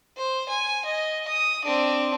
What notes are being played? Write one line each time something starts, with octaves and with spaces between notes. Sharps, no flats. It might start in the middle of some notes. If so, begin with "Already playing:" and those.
C5
G#5
D#5
D#6
C4 D4